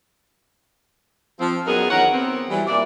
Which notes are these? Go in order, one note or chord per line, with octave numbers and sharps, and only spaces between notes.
F3 C4
F#2 B3 D#4 F#4 G#4 A#4
E2 D#3 A#4 C#5 F#5
B3 C4
E3 F#3 G3
A#2 D5 E5